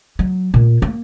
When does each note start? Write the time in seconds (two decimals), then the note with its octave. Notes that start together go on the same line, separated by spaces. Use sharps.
0.19 F#3
0.54 A#2
0.82 A#3